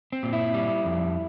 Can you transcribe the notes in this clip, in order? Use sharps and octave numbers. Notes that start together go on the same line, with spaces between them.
C4
A#2
E4
G3
F2